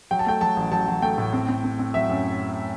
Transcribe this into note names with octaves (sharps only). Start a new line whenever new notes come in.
F#3 G5
A5
A3 G5
F#3 A5
A1
F#3 A5
F#3
A3 G5
A2
C4
C4
C4
C4
F#3 E5
F#2